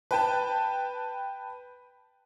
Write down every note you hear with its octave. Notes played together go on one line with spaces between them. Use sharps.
B4 G5 A5